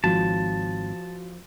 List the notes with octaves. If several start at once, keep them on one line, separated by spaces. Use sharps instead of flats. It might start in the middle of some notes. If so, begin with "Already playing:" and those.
G#1 F3 F#4 C#5 A5